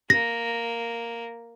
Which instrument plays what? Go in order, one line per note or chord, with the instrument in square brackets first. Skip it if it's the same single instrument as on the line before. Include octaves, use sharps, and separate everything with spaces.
[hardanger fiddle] A#3 [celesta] A#6